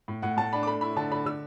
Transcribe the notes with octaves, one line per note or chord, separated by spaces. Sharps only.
A2
A2 F#5
A2 A5
D4 B5
D6
A3 B5
E4 B5
D3 A5
D3 B5
D3 E6